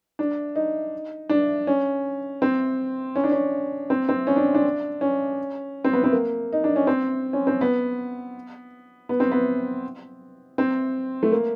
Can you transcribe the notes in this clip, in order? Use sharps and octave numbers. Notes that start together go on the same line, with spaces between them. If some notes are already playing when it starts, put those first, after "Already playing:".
D4
D#4
D4
C#4
C4
C#4
D4
C#4
C4
C4
C#4
D4
D4
C#4
C4
B3
C4
A#3
D#4
D4
C#4
C4
C#4
C4
B3
B3
C4
B3
C4
A3
A#3